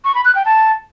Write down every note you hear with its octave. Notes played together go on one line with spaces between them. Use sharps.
C#6
B5
F#6
G5
A5